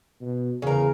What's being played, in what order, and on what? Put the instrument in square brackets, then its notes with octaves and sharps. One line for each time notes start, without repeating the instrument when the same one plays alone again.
[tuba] B2
[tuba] E2 [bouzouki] C#3 A#4